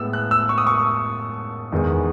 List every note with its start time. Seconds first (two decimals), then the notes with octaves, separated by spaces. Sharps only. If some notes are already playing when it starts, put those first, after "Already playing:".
Already playing: A2 G#3 B3 E6
0.13 F#6
0.31 E6
0.49 C#6
0.58 D#6
0.67 C#6
1.72 E2 D#3 G#3 B3